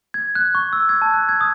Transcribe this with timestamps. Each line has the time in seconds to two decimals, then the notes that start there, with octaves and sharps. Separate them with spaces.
0.14 G#6
0.35 F#6
0.55 C#6
0.73 E6
0.89 G#6
1.02 A5
1.13 F#6
1.29 G#6
1.41 D#6